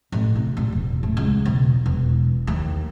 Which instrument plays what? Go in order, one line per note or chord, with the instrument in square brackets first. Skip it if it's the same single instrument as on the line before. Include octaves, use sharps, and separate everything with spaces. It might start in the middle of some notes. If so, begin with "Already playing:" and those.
[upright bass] A1
C3
A#2
E1
A2
C#2
E1
E1
D#2